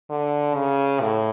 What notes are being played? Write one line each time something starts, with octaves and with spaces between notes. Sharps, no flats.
D3
C#3
A2